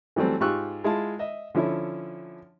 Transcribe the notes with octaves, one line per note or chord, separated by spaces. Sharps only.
E3 F#3 G3 A3 C4
G#2 F4 G4 C#6 E6 F#6
G#3 E4 F4 A5
D#5 E5
D3 F3 C#4 E4